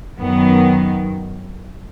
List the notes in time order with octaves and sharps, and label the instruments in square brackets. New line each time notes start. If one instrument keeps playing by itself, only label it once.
[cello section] F#2 D#3 F#3 B3